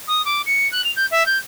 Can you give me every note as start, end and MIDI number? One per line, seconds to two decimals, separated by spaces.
0.07 0.22 87
0.25 0.42 86
0.46 0.70 97
0.72 0.81 90
0.84 0.92 101
0.96 1.06 91
1.11 1.26 76
1.26 1.38 91